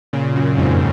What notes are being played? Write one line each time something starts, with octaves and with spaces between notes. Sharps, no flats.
A#2 C#3
F#2 A#2
F2 G#2